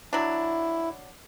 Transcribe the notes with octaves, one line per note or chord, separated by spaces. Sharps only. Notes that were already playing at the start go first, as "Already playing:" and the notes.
F#3 D4 E4